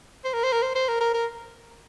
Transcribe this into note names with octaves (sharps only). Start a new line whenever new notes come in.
C5
A#4
C5
A#4
C5
C5
A#4
A#4
A#4